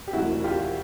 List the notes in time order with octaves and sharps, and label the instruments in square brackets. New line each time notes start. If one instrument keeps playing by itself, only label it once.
[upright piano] G4
E1 D2 C3 D#3 E4 F#4
F4 G4